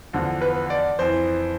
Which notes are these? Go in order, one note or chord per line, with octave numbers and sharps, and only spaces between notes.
E2 D3 F3
B4
D5
F2 E3 C5